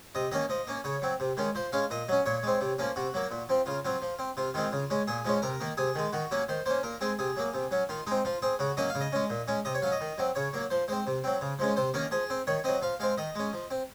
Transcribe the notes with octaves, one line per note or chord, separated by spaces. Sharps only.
C3 D#5
D#3 A#3 C#4 D#5
F3 D#5
A#3 C#4
C#3 C#5
F#3 C4
C3
D#3 G#3 C#4
F3 C5
G#3 C#4 F5
A#2 D#5
F#3 C#4
A#2 C#5
G#3 C4
C3
F3 A#3 C#4
C3 F#4
F#3 A#3
A#2
F3 C4
C#3 F4
F#3 C4 F4
F3
C4
C3 F4
D#3 G#3 C4 F4
C#3
G#3 C#4
A#2 G#4
F3 G#3 C#4
C3 A#4
D#3 A#3
C3 G#4
D#3 G#3
D#3 F#4
F#3 A#3 C#4
D#3 C5
A#3 C#4 C5
A#2 A#4
G#3 C4 G#4
C3 G#4
F#3 A#3
C3
F#3 C#4
D#3 F4
G#3 C4 D#4
F3 F4
C4 G#4
C#3 F#4
F#3 A#3 C#4 D#5
F5
C#3
D#5
G#3 C#4
A#2
G#3 C#4
C3 D#5
C#5
F#3 C#4 F5
D#5
D#3
F#3 C4
C#3 C#5
F#3 A#3
F3 C5
G#3 C4 C5
C3
F#3 C4
C#3
F3 G#3 C#4
C3 C5
D#3 A#3 C#4 A#4
F3 G#4
C4
D#3 C#5
F#3 C4 D#5
F3 F5
G#3 C4 F5
D#3 D#5
G#3 C#4
F3
C4